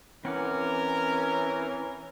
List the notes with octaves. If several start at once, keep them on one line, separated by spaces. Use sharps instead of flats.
E3 C4 C#4 A#4 F#5 D6